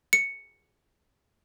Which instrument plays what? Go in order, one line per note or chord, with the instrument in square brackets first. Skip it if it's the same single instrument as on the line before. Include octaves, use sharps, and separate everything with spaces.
[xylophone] C#7